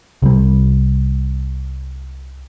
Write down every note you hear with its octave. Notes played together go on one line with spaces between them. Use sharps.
C2 G3